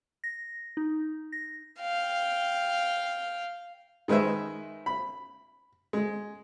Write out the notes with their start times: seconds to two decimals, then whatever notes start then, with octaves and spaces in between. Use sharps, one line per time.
0.24 A#6
0.77 D#4
1.32 A#6
1.80 F5 G5
4.08 D#3 G#3 B4 C5 E5
4.86 B5
5.93 G#3